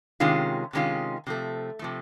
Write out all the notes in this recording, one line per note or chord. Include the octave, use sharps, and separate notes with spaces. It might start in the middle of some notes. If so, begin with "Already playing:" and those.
C3 D#3 G#3 C#4 F4
C3 D#3 G#3 C#4 F4
C3 F3 A3
C3 F3 A3